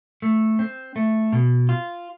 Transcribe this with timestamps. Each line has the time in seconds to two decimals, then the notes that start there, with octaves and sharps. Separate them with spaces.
0.22 A3
0.59 C4
0.96 A3
1.33 B2
1.69 F4